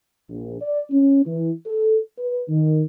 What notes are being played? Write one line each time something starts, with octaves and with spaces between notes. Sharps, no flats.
A#1
D5
C#4
E3
A4
B4
D#3